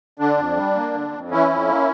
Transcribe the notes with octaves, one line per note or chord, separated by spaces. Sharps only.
D3 D4
F2
G3
A#3
D3
F2
E3 C#4 E4
F2
A#3